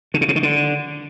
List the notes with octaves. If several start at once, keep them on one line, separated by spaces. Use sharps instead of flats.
D3
C#3
C3
D#3
D3